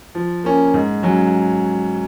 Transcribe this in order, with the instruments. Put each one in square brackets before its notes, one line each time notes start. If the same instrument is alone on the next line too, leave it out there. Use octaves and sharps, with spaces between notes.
[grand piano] F3
A#3 C#4
G#2
F#3 C#4